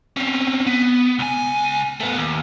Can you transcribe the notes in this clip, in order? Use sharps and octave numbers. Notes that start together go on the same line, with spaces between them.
C4 C#4
B3
C#2 G#5
A3 B3
D#2